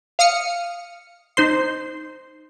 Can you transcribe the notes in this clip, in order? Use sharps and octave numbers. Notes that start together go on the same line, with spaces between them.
F5 D#6 F6 C#7
D#4 C5 C6